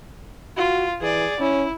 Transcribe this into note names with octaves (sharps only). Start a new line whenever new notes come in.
F4 F#4
E3 G#4 D5
C#4 E4